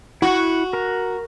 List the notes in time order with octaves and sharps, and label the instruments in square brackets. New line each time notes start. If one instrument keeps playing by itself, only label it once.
[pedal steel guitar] E4 C#6 [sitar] F#4
[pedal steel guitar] A#4 A#5